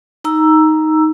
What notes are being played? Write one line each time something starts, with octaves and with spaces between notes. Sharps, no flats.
D#4 A#5 E6